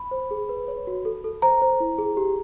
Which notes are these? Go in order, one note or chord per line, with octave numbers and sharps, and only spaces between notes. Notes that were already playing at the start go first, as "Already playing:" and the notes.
Already playing: B5
C5
G#4
B4
C#5
F#4
A4
A4
C5 A#5
C5
E4
G#4
G4